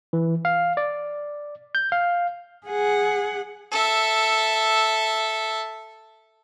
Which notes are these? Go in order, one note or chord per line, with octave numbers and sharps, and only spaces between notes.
E3
F5
D5
G6
F5
G#4 F#5
A4 E5